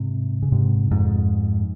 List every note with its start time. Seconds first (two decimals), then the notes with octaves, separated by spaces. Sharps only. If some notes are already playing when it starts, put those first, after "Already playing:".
Already playing: G#2 C3
0.42 C#3
0.52 G#2 C3
0.91 F2 G#2